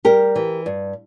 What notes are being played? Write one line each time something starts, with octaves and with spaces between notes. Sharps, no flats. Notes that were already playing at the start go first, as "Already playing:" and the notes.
G3 G4 A#4
E3
G2